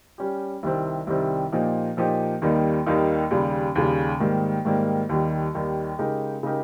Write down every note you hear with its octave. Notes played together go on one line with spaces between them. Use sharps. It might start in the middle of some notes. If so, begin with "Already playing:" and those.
G3 C#4 G4
C2 C3 D#3 G3 C4
C2 C3 D#3 G3 C4
A#2 F3 A#3 D#4 G4
A#2 F3 A#3 D#4 G4
D#2 D#3 G3 A#3 D#4
D#2 D#3 G3 A#3 D#4
D#2 C#3 G3
D#2 C#3 G3
G#2 D#3 G3 A#3
G#2 D#3 G3 A#3
D#2 D#3 G3
D#2 D#3 G3
C#3 G#3 D#4 G4 A#4
C#3 G#3 D#4 G4 A#4